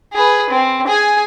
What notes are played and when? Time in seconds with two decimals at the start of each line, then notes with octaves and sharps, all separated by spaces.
0.13 G#4 B4
0.50 C4
0.87 G#4 G#5